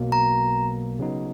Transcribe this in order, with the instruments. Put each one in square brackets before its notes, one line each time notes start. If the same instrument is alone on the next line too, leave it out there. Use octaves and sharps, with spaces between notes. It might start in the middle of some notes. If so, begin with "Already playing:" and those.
Already playing: [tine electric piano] B1 B2 F#3 A#3
[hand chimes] A#5
[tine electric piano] C#3 F#3 B3 D#4